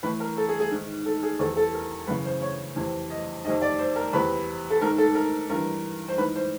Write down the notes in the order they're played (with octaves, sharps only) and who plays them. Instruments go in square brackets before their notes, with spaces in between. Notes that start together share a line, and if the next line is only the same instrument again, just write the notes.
[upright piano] A2 E3 B4
A#4
A4
G#4
G#4
G#2 D#3
A4
G#4
E2 C3 E3 A4
A4
A#4
F#2 C#3 E3 B4
C5
C#5
F2 C3 E3
D#5
F2 C3 D#3 D#5
D5
C5
A#4
E2 C3 E3 B4
A4
G#2 D#3 A#4
A4
A#4
G2 E3 A#4
C5
G#2 E3 B4
C5